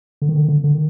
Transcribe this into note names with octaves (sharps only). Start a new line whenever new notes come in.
D3
D#3
D3
D#3
D3
D3
D#3